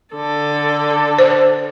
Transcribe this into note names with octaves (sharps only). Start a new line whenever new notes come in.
D3 A4
C5